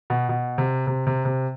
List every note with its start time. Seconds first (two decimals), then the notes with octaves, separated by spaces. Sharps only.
0.10 B2
0.29 B2
0.58 C3
0.87 C3
1.07 C3
1.25 C3